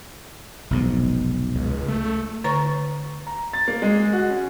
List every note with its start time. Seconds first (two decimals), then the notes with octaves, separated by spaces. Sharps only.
0.71 F1 B1 G#2
1.55 C#2
1.88 A3
2.44 D3 B4 C#5 A#5 C#6
3.27 A#5
3.53 A6
3.68 A#3
3.82 G#3
4.13 F#4
4.29 C#4